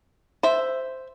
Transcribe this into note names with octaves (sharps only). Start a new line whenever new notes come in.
C5 E5